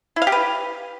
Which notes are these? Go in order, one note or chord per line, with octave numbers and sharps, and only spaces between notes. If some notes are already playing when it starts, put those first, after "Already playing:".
E4
F5
G4
B4